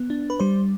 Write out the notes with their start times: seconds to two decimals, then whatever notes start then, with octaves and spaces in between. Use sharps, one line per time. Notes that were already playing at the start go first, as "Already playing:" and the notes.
Already playing: B3
0.10 D4
0.30 B4
0.40 G3 C5